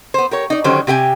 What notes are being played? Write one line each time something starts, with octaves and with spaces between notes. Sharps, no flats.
B3 C5
G4 A#4 C#5
D#4 D5
D3 D#3 F#3 C#4 G4 C5
C3 G4 G5 G#5